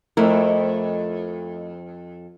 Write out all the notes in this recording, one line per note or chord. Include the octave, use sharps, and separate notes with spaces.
F2 A3 E4 A#4